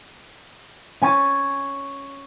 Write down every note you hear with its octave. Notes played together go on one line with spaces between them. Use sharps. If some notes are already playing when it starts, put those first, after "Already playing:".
C#4 G#5 C#6 A6 D#7